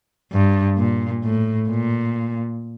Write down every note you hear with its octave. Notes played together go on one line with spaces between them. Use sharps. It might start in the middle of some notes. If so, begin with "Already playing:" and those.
G2
A#2
A2
A#2